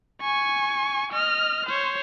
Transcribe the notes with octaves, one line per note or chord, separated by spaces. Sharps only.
G#5 C#6
D#5 F6
C5 C#5